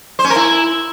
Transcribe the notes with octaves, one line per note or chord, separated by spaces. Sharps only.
C5
C#4
A#4
E4